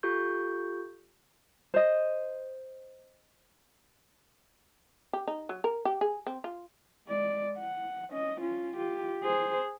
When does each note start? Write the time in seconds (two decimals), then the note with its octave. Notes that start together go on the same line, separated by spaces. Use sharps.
0.03 F4 G4 A4 C#6 G6
1.74 C5 D#5
5.13 G4
5.28 D#4
5.49 F#3
5.64 A#4
5.85 G4
6.01 G#4
6.27 C4
6.44 F4
7.08 G#3 D5
7.58 F#5
8.10 C#4 D#5
8.41 C#4 F4
8.77 F4 G4
9.23 G#4 C5